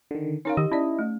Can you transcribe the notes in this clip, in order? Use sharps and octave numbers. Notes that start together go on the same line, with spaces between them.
D3 D#3
C#4 D#4 A#4 C#5 F5
D#3 G4 D#5
C#4 E4 D5
A3